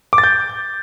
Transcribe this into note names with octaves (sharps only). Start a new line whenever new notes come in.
D6
A6
G6